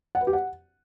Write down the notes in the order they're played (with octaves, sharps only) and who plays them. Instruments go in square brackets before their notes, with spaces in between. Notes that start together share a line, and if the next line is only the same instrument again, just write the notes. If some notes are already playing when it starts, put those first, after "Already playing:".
[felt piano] F#5
B4
G4
F#5